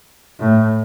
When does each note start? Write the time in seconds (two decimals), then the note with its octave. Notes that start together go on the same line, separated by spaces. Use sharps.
0.40 A2